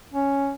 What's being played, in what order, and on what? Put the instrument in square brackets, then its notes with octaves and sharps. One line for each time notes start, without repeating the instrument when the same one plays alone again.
[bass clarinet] C#4